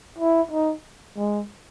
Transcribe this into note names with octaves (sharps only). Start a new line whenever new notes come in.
E4
D#4
G#3